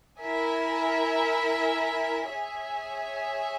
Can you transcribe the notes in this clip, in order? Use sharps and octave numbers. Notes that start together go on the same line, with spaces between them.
E4 A#4 E5 G#5
G#4 C#5 E5 G#5